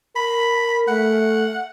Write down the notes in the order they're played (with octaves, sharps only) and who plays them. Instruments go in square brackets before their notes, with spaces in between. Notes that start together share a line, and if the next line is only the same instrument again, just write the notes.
[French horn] A#4 [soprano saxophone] B5
[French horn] A3 [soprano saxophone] F#5